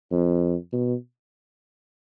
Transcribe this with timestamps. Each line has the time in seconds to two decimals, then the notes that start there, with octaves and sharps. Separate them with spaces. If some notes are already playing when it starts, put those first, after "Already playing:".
0.12 F2
0.73 B2